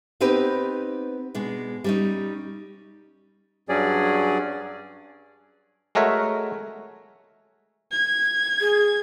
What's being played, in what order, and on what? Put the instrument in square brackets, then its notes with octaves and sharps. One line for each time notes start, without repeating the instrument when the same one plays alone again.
[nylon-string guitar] B3 C4 D#4 G4 B4
B2 G#3 D4
G3 C#4 D#4
[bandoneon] G2 F#3 C#4 G#4 D5
[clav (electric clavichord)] G#3 A3 F#4 A#4 C#5 E5
[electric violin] G#6
[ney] G#4